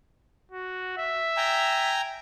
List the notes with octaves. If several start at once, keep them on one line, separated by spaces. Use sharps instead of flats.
F#4
E5
G5 G#5 A#5